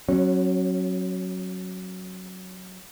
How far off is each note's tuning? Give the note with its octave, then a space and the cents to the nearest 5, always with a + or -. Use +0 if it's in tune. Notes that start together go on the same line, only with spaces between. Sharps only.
F#3 +0 C#4 -30